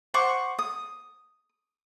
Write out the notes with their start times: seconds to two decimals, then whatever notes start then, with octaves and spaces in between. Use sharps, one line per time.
0.14 C5 F#5 C#6 D6
0.59 D#6